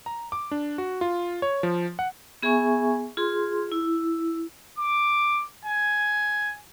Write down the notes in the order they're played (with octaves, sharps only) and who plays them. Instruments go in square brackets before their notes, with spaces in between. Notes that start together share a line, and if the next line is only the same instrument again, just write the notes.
[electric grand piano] A#5
D6
D4
F#4
F4
C#5
F3
F#5
[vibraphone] B3 G#4 E5 G#5 C#6
F4 G#4 C6
E4
[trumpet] D6
G#5